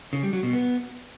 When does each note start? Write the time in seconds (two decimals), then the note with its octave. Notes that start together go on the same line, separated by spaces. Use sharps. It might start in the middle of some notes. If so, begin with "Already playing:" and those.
0.13 C#3
0.23 G3
0.33 F#3
0.43 B2
0.53 B3